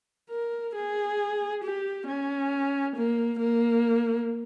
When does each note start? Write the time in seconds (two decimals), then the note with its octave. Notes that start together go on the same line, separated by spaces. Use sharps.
0.30 A#4
0.75 G#4
1.64 G4
2.07 C#4
2.96 A#3
3.39 A#3